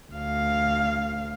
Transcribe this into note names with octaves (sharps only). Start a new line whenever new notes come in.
D2 F5